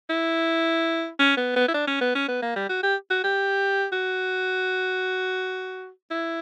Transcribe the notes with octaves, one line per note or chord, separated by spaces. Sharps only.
E4
C#4
B3
B3
E4
D4
C#4
B3
C#4
B3
A#3
G3
F#4
G4
F#4
G4
F#4
E4